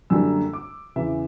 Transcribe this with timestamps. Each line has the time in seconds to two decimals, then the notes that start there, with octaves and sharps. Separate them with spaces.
0.10 F#2 D3 G3 A#3 E6
0.53 D6
0.96 E2 C#3 E3 E5